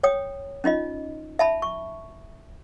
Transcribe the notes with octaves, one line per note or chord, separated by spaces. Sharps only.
C#5 G5 D#6
C#4 D#4 F4 D#5
E5 A5 B5
C#6